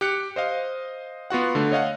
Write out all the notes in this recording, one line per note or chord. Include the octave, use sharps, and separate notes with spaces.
G4 F#6 C#7
C5 D#5 F5
B3 F4 F#4 F#5
D3 A3
C#5 D#5 F5 F#5